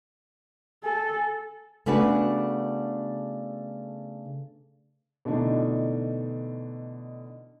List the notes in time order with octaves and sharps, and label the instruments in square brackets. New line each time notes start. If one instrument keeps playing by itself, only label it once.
[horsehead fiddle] A4 [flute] G#5
[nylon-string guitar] C#3 A3 B3 D4 F#4 B4
[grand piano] B2 D3 E3 A3 D4 D#4